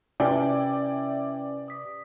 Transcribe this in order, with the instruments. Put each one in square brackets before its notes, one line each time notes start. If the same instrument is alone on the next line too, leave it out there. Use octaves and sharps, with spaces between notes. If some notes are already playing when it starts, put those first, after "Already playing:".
[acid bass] C3 [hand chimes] C#4 B4 [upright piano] E4 G5 G#5 [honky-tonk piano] D5
[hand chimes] D#6 B6